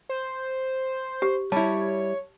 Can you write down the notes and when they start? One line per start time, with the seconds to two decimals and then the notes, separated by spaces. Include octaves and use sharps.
0.09 C5
1.22 G4
1.52 G3 E4 C#5 A5